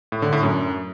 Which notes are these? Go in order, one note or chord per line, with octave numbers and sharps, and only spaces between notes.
A2
D3
A2
F#2